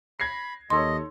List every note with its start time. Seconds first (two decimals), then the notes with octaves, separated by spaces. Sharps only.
0.20 B5 G#6 A#6 C7
0.70 D#2 D#4 A4 C#5 D#5 C6